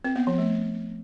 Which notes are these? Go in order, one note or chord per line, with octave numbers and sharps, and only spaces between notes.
C4
B3
F3
A3